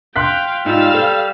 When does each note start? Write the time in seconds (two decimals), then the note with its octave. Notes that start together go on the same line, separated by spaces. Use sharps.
0.16 F5 G5 C6 F#6 B6
0.66 G#2 G3 D#4 F4 F5 E6
0.94 A4 C5